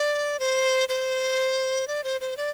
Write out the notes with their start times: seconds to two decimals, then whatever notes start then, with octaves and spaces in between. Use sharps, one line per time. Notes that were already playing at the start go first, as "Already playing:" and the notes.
Already playing: D5
0.40 C5
0.89 C5
1.88 D5
2.04 C5
2.21 C5
2.37 D5